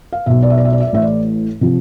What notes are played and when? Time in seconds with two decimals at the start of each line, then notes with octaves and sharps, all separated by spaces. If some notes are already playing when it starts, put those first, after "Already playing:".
0.13 F5
0.26 B1 B2 E5
0.43 D5
0.50 E5
0.57 D5
0.65 E5
0.72 D5
0.80 E5
0.87 D5
0.93 A1 A2 E3 E5
1.02 D5
1.61 C3 F3